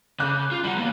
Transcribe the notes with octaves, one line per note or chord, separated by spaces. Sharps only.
C#3 D6 F#6 G6
F4
G3 F#5 B5
E2 A#3